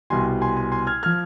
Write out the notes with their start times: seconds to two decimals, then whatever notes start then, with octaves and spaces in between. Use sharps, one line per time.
0.10 C2 B2 G3 G#5 C6
0.42 G#5 C6
0.57 G#5 C6
0.72 G#5 C6
0.87 F6 G#6
1.03 F3 F6 G#6